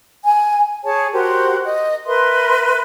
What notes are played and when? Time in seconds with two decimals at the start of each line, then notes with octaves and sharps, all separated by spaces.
0.24 G#5
0.83 G#4 C#5 A5
1.13 F#4 G4 A#4 C5
1.64 D#5
2.06 A#4 B4 E5 C6